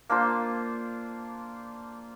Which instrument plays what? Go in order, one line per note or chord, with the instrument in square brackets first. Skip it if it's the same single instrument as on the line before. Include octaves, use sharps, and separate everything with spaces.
[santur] A#3 D4 F4 C5